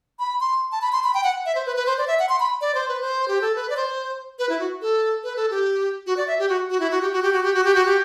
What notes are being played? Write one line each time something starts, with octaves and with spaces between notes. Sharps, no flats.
B5
C6
A5
B5
C6
B5
G5
F#5
E5
C5
B4
B4
C5
D5
E5
F#5
C6
B5
D5
C5
B4
C5
G4
A4
B4
D5
C5
B4
E4
F#4
A4
B4
A4
G4
F#4
D5
E5
G4
F#4
F#4
E4
F#4
G4
F#4
G4
F#4
G4
F#4
G4
F#4
G4